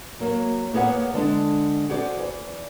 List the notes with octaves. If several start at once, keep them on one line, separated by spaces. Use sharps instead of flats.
F#3 A#3
A#3 B3 G#4 C#5 F#5
D3 G#3 D4
F#4 G#4 C5 D5
E2